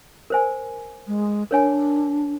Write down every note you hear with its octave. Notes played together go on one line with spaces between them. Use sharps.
A#4 C5 G#5
G#3
D4 A#4 C#5 G#5